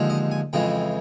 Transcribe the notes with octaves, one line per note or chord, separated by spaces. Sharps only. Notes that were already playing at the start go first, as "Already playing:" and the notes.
Already playing: D#2 D3 F3 G#3
D#5
G#5
F2 C#3 E3 G#3 G5